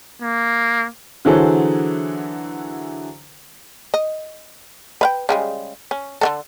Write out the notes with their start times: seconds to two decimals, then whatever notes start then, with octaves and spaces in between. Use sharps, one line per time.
0.22 A#3
1.25 D3 E3 F#3 G#4 A4 C5
3.94 D#5
5.01 B4 F5 G5
5.29 C#3 G3 G#3
5.91 C#4
6.21 D3 D#3 A4